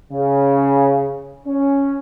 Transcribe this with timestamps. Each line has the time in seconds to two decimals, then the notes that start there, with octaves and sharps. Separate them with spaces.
0.12 C#3
1.47 C#4